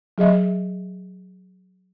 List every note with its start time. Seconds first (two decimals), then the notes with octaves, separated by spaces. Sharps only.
0.18 F#3 G#4 D#5 E5